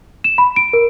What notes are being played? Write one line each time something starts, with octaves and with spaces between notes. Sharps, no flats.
E7
B5
D7
A#4